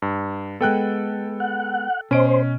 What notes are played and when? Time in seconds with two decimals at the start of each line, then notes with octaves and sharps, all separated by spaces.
0.02 G2
0.61 G#3 B3 A4 G5 F#6
1.40 F#5
2.11 B2 C#4 C5 D#5 D7